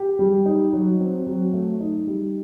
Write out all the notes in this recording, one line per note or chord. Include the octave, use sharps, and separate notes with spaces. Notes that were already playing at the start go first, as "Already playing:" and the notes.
Already playing: G4
G3
D#4
F#3
C4
F#3
A3
D#4
G3